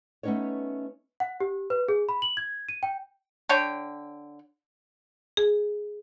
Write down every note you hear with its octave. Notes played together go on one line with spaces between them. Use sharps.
A3 B3 C#4 D#4 B4 C#5
F#5
G4
B4
G#4
B5
F#7
G#6
D#7
G5
D3 C#5 G5
G#4